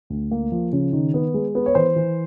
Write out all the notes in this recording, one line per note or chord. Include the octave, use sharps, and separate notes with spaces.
D2
A#3
F3
C#3
D#3
B3
G#3
B3
C#5
E3 C5
E3